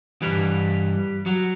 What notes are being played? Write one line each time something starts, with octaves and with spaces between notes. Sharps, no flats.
G2 E3 G3
F#3